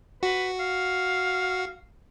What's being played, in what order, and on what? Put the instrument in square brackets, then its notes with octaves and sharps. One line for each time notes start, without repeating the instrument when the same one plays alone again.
[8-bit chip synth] F#4 [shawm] B4
[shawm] F5